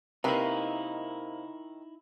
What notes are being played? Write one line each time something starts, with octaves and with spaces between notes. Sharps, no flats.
C3 D#3 A#3 D#4 E4 B4